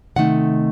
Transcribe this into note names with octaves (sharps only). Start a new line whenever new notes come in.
C3 D#3 A3 D#4 F#5